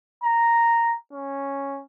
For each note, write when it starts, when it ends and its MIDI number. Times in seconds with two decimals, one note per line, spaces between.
0.23 0.95 82
1.13 1.81 61